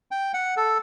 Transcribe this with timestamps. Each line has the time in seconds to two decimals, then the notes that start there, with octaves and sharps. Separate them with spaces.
0.11 G5
0.34 F#5
0.57 A4